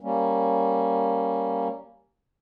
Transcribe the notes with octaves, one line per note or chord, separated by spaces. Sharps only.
G3 A#3 C#4